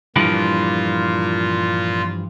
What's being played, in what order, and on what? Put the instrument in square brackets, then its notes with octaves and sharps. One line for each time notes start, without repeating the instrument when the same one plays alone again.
[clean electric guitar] G2 E3 F3 [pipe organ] A#2 F4